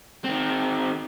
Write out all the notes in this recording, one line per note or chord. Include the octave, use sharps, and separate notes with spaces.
D#3 C4